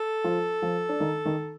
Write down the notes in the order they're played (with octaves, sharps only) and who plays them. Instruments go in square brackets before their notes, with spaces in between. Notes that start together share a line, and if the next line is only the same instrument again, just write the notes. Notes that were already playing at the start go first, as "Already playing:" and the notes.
Already playing: [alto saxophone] A4
[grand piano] F3 F4
F3 F4
D4
D#3 D#4
D#3 D#4